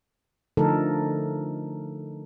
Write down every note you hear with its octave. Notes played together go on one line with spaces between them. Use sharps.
D3 F3 A3 D#4 A4 A#4